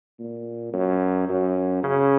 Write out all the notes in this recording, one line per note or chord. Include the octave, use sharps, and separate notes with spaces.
A#2
F#2
F#2
C#3